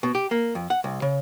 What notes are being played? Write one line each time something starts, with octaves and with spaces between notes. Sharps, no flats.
B2
G4
A#3
F2
F#5
C2
C#3